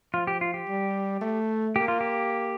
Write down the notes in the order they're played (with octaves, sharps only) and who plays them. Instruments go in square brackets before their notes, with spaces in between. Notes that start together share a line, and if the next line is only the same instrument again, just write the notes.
[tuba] F3 [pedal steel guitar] F4
[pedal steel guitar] G4
F4
G4
[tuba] G3
A3
[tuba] A#3 [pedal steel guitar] G4
[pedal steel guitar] F4
G4